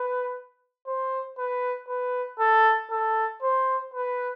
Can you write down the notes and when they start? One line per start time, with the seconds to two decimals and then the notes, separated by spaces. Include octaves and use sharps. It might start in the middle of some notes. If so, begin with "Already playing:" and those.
Already playing: B4
0.87 C5
1.38 B4
1.88 B4
2.40 A4
2.90 A4
3.42 C5
3.94 B4